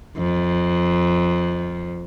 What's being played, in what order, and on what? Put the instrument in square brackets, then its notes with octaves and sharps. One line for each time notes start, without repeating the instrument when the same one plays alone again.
[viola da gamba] F2